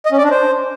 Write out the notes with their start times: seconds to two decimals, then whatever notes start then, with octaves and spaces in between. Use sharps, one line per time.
0.06 D#5
0.12 C#4
0.18 D5
0.24 D4
0.30 C5